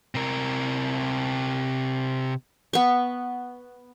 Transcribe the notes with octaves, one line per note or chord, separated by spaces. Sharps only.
C3 A#4
B3 C#6